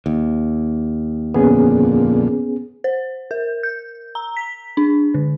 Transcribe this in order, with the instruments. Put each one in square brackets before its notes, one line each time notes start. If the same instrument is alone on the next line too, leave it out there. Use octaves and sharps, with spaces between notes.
[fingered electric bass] D#2
[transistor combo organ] F2 A#2 D3 [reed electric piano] B3 C#4 G#4
[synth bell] C5
A#4
G6
A#5
B6
D4
D3